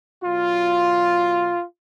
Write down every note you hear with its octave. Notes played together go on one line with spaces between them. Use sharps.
B2 F#3 F4